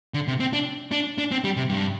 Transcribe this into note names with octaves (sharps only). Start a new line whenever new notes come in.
D3
C3
C4
D4
D4
D4
C4
G3
C3
G2